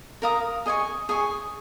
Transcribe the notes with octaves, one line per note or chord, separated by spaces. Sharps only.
A#4 F5 A#5 D#6
G#4 D#5 G#5 C#6
G#4 D#5 G#5 C#6